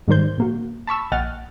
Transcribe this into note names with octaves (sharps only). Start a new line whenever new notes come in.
G#2 D#3 G3 A#4 C5 G6
A#2 A#3 F#4
A5 B5 C#6 E6
A#1 D#5 F#5 G5 F6 A6